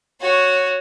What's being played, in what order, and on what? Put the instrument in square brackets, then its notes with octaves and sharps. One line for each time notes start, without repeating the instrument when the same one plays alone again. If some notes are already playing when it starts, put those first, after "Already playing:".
[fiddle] F#4 C#5